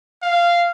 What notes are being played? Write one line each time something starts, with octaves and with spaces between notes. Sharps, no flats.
F5